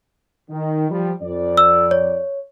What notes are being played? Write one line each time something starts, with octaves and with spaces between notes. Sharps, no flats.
D#3
F3 G3
F2 D5
E6
C#5